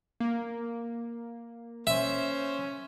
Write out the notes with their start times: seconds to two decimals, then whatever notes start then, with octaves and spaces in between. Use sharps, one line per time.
0.20 A#3
1.87 C#4 C5 E5